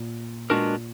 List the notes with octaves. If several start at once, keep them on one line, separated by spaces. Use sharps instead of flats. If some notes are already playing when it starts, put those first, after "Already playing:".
Already playing: A#2
A#2 G#3 B3 D4 F#4 A#4